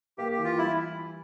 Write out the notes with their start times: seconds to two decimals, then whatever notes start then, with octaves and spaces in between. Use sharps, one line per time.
0.18 A#3 G4
0.32 G4
0.38 E3
0.44 F4
0.58 G3 E4